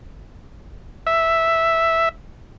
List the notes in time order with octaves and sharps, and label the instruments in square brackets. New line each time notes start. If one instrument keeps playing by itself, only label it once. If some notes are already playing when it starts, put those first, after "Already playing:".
[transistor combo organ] E5